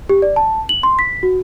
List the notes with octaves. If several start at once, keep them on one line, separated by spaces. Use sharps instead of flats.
G4
D5
A5
F#7
C6
B6
F#4